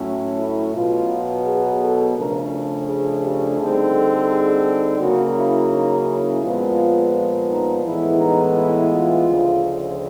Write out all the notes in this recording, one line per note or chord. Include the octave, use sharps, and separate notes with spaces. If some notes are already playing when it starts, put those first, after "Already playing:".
Already playing: A2 F#3 A3 C#4
E4
B2 F#3 B3 F4
G#4
A4
C#3 F3 A3 D4 A#4
G#4
G4
D3 G3 C4 D#4 G#4
A4
G#4
C#3 F#3 A#3 C#4 F#4
E4
D#4
E4
A#2 F3 G#3 B3 F4
D#4
A2 E3 G#3 B3 E4
D#4
E4
F4
D2 C#3 F3